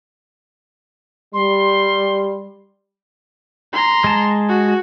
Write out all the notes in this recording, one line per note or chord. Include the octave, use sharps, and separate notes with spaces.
G3 C6
A#5 C6
G#3 A5
F#4